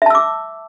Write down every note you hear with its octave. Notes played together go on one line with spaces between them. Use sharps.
E5 A5 D6 E6